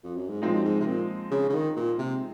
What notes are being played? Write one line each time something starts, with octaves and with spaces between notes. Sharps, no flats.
F2
F#2
G#2
A#2 F3 G#3 C4 D#4
F#2
G#2
C3
A#2
C#3
C#3
D#3
A#2
C3